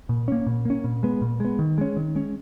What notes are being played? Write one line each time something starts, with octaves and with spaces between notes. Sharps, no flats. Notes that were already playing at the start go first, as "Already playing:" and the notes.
A#2
A#3 C#4
A#2
A#3 C#4
A#2
G#3 B3
A#2
G#3 B3
D#3
G#3 C#4
D#3
G#3 C#4